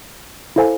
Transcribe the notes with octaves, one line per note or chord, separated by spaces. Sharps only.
E4 A4 C5 F5 G#5